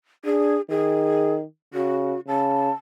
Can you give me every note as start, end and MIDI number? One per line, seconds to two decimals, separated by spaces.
0.25 0.57 62
0.25 0.61 68
0.70 1.44 51
0.70 1.34 68
1.74 2.15 49
1.74 2.20 66
2.28 2.70 49
2.28 2.72 81